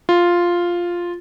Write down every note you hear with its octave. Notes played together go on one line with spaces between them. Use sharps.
F4